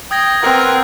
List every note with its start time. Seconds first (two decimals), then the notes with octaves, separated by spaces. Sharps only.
0.11 G5 D#6 G#6 A#6
0.43 B3 C4 A#4 F#5 F#6 G#6